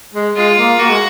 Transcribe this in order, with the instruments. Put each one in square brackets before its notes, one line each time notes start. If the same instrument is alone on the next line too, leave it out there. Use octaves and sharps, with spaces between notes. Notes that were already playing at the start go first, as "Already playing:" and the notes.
[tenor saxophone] G#3
[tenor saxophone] G#3 [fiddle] F4
[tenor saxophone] A#3
[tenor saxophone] A#3 [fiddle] F#4
[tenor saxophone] G#3